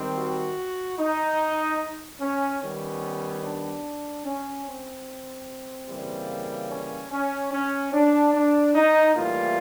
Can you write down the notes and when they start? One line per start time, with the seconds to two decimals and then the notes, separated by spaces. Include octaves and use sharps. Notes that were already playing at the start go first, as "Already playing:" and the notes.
Already playing: D#3 G3 C4
0.17 F#4
0.99 D#4
2.21 C#4
2.62 D#3 G3 B3 C#4
3.44 D4
4.26 C#4
4.67 C4
5.89 C#3 E3 G3 A#3
6.71 C#4
7.12 C#4
7.52 C#4
7.93 D4
8.34 D4
8.75 D#4
9.16 A2 E3 G3 A#3 F4